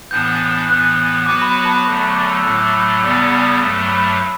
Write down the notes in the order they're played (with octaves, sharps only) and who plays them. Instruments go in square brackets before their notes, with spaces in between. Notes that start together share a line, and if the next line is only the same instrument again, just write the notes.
[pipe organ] A2 E3 B3 D4 [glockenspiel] G6
[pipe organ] A2 E3 B3 [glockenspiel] F#6
[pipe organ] F#3 B3 F#4 B4 [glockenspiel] D6
[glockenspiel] B5
B5
A5
B5
[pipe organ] E2 D3 F#3 A3 [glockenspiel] C#6
[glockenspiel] C#6
D6
E6
[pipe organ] A2 F#3 A3 [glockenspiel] F#6
[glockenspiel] E6
D6
B5
[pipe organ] E2 C#3 G3 B3
[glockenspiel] B5
[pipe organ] G2 F#3 A3
[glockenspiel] B5